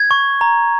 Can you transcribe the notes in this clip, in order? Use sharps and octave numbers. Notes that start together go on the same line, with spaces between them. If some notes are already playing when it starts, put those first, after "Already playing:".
Already playing: G#6
C#6
A#5